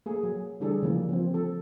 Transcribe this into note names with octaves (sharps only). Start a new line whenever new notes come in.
A#3 G#4 A4
F#3
D3 E3 G3 D4 G#4 A4
C#3 E3 F3 A#3
F3 C4
A4